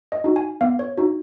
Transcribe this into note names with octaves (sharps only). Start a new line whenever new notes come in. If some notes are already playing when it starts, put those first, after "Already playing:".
D#5
D#4 F#4
G#5
B3 F5
C#5
D#4 F#4